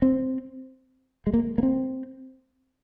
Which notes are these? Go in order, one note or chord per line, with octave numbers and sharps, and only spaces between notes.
C4
G#3
A#3
A#3
C4